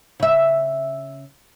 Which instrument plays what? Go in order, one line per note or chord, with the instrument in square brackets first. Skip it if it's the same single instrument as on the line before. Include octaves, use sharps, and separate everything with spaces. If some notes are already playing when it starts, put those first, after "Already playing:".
[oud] C#3 E5